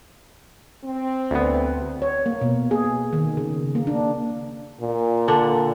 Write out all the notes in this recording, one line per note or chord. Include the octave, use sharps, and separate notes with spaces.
C4
D2 B3
C#5
A#3
B2
G#4
D#3
C#3
A#3
D4
A#2
D3 D4